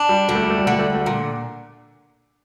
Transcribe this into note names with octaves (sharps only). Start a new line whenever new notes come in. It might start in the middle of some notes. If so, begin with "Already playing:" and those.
Already playing: D4
G3
D3 G3
A3
G3
A3
G3
D3 A3
G3
A3
G3
A3
G3
A#2